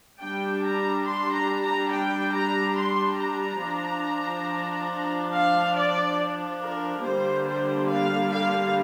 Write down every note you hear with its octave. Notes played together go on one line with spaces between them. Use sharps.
G3 D4 G5
A#5
C6
A#5
A#5
G5
A#5
C6
A#5
F3 D4
F5
D5
A#4
D3 G3 A#3 D4 C5
C5
F5
F5